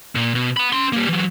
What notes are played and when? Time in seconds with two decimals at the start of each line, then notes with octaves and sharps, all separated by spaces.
0.15 A#2
0.35 B2
0.57 F#5 B5
0.73 C#4 C6
0.92 G3 A#3
1.09 E3 F#3